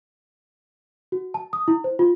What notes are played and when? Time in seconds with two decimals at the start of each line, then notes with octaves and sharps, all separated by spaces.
1.12 F#4
1.34 A5
1.53 D#6
1.68 E4
1.84 C5
1.99 F4